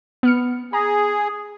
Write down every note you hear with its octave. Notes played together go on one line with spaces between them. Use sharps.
B3 F6 C#7
G#4 A#5